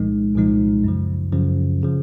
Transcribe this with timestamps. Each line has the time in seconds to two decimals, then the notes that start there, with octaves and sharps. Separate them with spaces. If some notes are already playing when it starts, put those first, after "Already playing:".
Already playing: C2 A#2 F3 G#3 D#4
0.36 C2 A#2 F3 G#3 D#4
0.84 F#2 C#3 F3
1.32 F#2 C#3 F3
1.83 C#3 F3